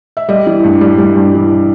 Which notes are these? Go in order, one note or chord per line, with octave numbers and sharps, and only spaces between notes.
E5
G3 D#5
E3
G2
G3
G3
G2
E3